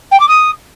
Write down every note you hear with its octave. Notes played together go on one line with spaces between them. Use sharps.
G5
D6
D#6